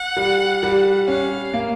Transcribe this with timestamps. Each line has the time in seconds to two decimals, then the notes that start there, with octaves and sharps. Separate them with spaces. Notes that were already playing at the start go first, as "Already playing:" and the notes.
Already playing: F#5
0.17 G3
0.63 G3
1.08 C#4 F5
1.54 A#3